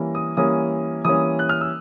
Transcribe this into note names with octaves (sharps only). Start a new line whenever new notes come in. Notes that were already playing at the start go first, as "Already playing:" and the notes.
Already playing: E3 G3 A#3 C#4
D#6
E3 G3 A#3 C#4 D#6
E3 G3 A#3 C#4 D#6
F#6
F6
E6